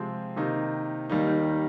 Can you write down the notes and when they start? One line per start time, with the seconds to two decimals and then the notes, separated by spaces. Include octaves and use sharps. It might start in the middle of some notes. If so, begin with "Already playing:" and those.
Already playing: C3 F3 G#3 C4
0.36 C3 D#3 A#3 D#4
1.10 D#2 D#3 G3 A#3 D#4